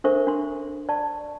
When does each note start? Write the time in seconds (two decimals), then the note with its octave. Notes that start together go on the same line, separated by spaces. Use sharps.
0.04 D4 A4 A#4 C5 E5 C#6
0.27 D4 C6
0.89 D5 A5 C#6